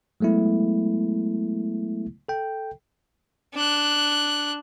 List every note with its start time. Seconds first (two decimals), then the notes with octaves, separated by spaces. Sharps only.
0.20 F#3 G#3 A3 B3 E4
2.29 A4 G5
3.54 D4 F#6